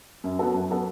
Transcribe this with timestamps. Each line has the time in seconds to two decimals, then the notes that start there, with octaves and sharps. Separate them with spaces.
0.24 F#2
0.39 F#3 B3 A4
0.54 F#2
0.69 F#3 B3 A4